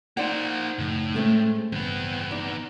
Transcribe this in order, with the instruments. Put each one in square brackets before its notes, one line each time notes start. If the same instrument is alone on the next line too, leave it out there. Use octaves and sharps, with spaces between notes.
[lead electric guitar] A#3 C5 [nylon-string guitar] D#4 D5 F#5
[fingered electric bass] F#2 C#3 F3 [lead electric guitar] A2
[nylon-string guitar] G#3 A3 C4 [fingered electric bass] C#4
[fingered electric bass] A1 G2 C#3 [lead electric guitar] E2 B3 [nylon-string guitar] C4
[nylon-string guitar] D#4 D5